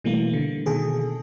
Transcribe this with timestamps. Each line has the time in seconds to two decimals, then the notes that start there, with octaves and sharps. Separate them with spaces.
0.04 B2 E3 G3 A3 A#3
0.33 D3
0.66 B2 D#3 G#4 A4